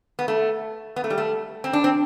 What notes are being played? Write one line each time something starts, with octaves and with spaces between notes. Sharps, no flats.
B3
A3
B3
A3
G3
A3
C4
D4
C4